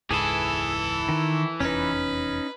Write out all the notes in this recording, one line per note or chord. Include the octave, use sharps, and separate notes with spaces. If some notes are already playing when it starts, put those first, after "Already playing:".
E1 C#2 G#2 E3 E4 G#4 A4
D#3
F1 E2 C#4 D#4 B4